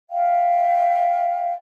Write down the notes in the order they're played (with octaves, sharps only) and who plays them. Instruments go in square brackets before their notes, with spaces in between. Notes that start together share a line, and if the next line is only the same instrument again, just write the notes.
[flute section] E5 F5 G5